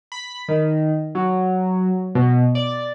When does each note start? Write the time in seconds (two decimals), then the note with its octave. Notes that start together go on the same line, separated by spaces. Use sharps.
0.12 B5
0.48 D#3
1.15 F#3
2.15 B2
2.55 D5